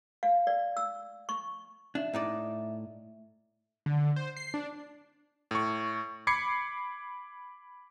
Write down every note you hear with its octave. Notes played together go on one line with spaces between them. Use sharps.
F5
D5
E6
C#6
D4 E5
A2 D#4 D5
D3
C5
C7
D4
A2 C#6
B5 D6 G#6 C7 C#7